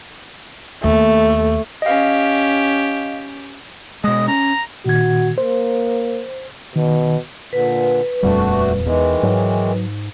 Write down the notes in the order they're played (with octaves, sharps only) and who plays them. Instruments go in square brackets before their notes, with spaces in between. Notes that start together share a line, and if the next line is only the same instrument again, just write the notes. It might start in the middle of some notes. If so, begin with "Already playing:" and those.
[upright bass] D#2 [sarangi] A3
[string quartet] C#4 G4 [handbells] D#5 F5
[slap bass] B2 G#3 [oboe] D#5
[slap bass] C#4 [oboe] A#5
[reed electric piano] A#2 D#3 G#6 [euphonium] F#4
[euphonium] A#3 [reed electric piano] C5
[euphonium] B2 [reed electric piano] D#3
[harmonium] A#2 D3 [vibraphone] B4
[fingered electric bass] D#1 F2 A#2 [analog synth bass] G3 [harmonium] A3 D4 F#4
[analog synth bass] E2 [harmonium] D#3 E3 G#3
[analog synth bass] G#2 [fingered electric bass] F#3